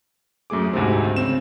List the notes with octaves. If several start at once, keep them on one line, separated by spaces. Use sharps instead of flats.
F#2 A3 G#4 D6
D2 G#2 C3 C4
C#3 C4 E7